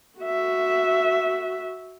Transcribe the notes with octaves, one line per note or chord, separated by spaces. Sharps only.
F#4 E5